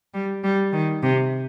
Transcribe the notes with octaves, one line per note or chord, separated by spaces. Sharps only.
G3
G3
D#3
C3